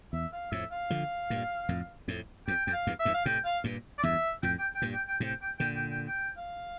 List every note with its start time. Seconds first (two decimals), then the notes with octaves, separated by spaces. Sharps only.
0.13 E2 E5
0.33 F5
0.51 F2 A2 E5
0.71 F5
0.90 D3 F3
1.30 G2 A#2
1.69 F2 A2
2.08 F2 A2
2.47 F2 G5
2.66 F2 G5
2.73 F5
2.87 E2 G2
3.00 E5
3.05 E2 G2
3.14 F5
3.25 A2 C3 G5
3.44 F5
3.64 G2 A#2
3.98 D5
4.03 E2 G2 E5
4.43 F2 A2 G5
4.59 G5
4.75 G5
4.82 G2 A#2
4.93 G5
5.08 G5
5.20 A2 C3 G5
5.42 G5
5.59 A#2 D3 G5
5.75 G5
5.91 G5
6.08 G5
6.37 F5